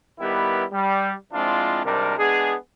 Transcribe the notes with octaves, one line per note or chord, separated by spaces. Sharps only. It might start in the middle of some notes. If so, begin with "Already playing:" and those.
D#3 G3 B3 E4 G4 B4
G3
F3 G#3 C4 D4 E4 F4
G#1 C3 G3 D4 A#4
G#3 B3 D4 G#4